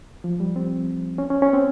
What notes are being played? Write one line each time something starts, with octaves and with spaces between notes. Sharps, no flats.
F3
G3
C4
C#4
C#4
C#4
C4